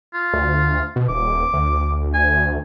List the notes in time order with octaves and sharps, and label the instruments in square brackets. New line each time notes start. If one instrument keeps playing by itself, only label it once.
[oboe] F4
[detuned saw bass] D2
B2
[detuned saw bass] D#1 [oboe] D6
[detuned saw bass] D2
[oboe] G#5